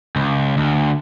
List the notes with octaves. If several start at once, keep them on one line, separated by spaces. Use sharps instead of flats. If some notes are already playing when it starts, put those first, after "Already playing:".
C#2
D2